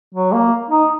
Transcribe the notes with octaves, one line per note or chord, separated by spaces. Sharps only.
F#3
A#3
D#4